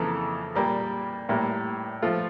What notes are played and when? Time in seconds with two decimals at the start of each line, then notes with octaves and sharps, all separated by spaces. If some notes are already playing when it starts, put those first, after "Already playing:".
Already playing: F2 C#3 E3 A#3 A4
0.55 A#2 G3 A#3
1.29 A2 G3 A#3
2.02 F3 A3 F4